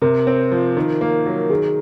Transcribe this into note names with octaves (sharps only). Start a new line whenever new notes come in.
C3 A#4
C4
F3
D#3
A#3
F#3
D#3 G#4